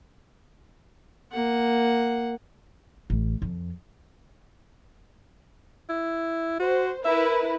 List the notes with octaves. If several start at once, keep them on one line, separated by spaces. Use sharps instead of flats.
A#3 F#5
A1
F2
E4
F#4 C5
E4 A#4 B4 E5